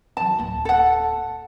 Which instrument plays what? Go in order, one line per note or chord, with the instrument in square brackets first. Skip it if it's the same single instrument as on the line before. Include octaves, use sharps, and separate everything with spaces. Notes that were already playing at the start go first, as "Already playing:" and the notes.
[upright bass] D#3 F#3 [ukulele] A5
[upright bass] D1 A#3
[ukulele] A4 F#5